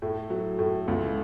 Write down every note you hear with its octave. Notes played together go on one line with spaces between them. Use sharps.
A2
F#3
A2
C#2